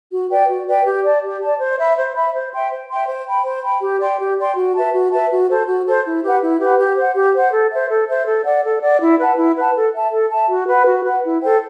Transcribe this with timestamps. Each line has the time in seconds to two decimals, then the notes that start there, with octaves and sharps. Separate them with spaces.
0.11 F#4
0.30 B4 D5 G5
0.49 F#4
0.67 B4 D5 G5
0.86 G4
1.04 D5 A5
1.23 G4
1.42 D5 A5
1.59 C5
1.78 E5 B5
1.97 C5
2.15 E5 B5
2.34 C5
2.53 E5 G5 C6
2.71 C5
2.89 E5 G5 C6
3.08 C5
3.26 G5 B5
3.44 C5
3.63 G5 B5
3.82 G4
4.00 D5 G5 C6
4.19 G4
4.38 D5 G5 C6
4.55 F#4
4.74 B4 E5 A5
4.93 F#4
5.11 B4 E5 A5
5.30 F#4
5.49 A4 C5
5.67 F#4
5.86 A4 C5
6.05 E4
6.23 G4 B4 F#5
6.42 E4
6.60 G4 B4 F#5
6.78 G4
6.97 C5 F#5
7.15 G4
7.34 C5 F#5
7.52 A4
7.71 C5 E5
7.89 A4
8.08 C5 E5
8.27 A4
8.45 D5 F#5
8.63 A4
8.82 D5 F#5
9.01 E4
9.19 B4 F#5 A5
9.38 E4
9.56 B4 F#5 A5
9.75 A4
9.94 E5 A5
10.12 A4
10.30 E5 A5
10.49 F#4
10.67 B4 F#5
10.86 F#4
11.05 B4 F#5
11.23 E4
11.42 A4 C5 G5